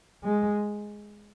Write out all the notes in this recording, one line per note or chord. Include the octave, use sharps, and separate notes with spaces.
G#3